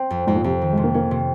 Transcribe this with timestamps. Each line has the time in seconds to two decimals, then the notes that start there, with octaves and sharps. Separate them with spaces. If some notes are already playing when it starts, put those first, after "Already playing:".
Already playing: C4
0.10 F2
0.27 F2 G#2
0.36 A#2
0.44 F2 C3
0.62 D#3
0.73 G#3
0.77 C3
0.84 A#3
0.94 A#3 C#4
1.11 C3